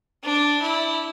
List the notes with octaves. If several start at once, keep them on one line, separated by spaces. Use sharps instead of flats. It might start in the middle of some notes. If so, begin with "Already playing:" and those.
D4
E4